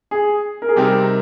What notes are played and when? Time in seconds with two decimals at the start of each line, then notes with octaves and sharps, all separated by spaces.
0.11 G#4
0.62 A#4
0.69 G#4
0.76 C3 G3 C4 D#4 G4 A#4